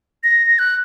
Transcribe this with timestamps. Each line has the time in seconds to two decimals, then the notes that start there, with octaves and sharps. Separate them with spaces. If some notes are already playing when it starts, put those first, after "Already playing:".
0.24 A#6
0.59 F#6